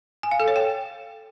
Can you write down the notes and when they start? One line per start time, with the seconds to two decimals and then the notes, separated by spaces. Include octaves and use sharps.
0.23 G#5
0.31 F5
0.40 A4
0.48 C#5
0.56 G5